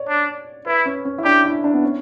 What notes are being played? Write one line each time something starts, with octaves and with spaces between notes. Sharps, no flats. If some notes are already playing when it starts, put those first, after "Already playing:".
Already playing: C#5 D5
D4
E4 B4
C#4
C#4
E4
D4 G4
E4
D4
B3
C#4